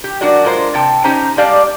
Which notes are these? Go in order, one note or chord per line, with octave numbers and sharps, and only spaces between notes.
G4
F#3 D4 F#4 A#4 D5
G#3 F4 A#4 C5
C3 G5 A5
C#4 D#4 G4 C5 A#5
G3 G#3 G4 D5 F5 A5